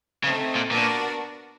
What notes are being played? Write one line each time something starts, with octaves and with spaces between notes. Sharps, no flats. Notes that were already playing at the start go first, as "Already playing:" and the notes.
C#3 A3 C4 D#4
A#2
A#2 B3 D4 F#4 A#4 D5